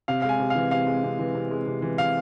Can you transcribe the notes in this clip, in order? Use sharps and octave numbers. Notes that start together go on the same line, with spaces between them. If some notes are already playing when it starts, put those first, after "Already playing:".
C3 F5
G#3 F5
G#5
C3
F5
E3
C3 F5
G#3
C3
E3
C3
G#3
C3
E3
C3 F5